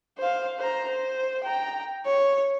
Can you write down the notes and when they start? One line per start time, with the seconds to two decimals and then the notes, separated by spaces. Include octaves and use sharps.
0.18 C5 F5
0.58 C5 A#5
0.88 C5
1.44 G5 A#5
2.06 C#5